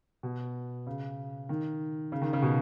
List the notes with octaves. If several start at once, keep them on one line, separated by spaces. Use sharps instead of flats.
B2
C#3
D#3
C#3
D#3
C#3
B2